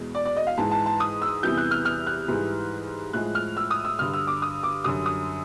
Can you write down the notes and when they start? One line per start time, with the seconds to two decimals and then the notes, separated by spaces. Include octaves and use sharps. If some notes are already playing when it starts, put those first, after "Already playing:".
Already playing: E2 B2 G#3
0.15 D5
0.26 D5
0.36 D#5
0.47 F5
0.57 G#2 E3 G#3 A5
0.71 A5
0.86 A5
1.00 D#6
1.22 E6
1.43 E2 C3 E3 G3 G6
1.57 F#6
1.71 F6
1.85 F6
2.07 F#6
2.28 G#2 E3 G3
3.13 A2 F3 G#3 F#6
3.35 F6
3.57 E6
3.71 D#6
3.85 E6
3.99 G2 D3 G3 F6
4.14 E6
4.27 D6
4.42 D#6
4.63 D6
4.84 F#2 D3 G3 D#6
5.06 D#6